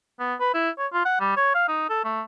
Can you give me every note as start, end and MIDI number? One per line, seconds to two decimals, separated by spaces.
0.20 0.34 59
0.40 0.50 71
0.54 0.70 64
0.78 0.87 73
0.93 1.02 65
1.05 1.17 78
1.20 1.37 55
1.37 1.52 73
1.55 1.68 77
1.68 1.88 63
1.90 2.03 69
2.04 2.21 57